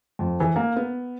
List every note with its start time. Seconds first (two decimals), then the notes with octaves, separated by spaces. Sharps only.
0.19 F2
0.40 E3
0.56 A#3
0.76 B3